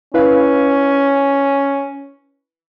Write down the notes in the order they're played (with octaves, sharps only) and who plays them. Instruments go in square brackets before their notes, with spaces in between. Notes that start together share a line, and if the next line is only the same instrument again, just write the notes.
[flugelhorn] C#4 [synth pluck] E4 B4 F5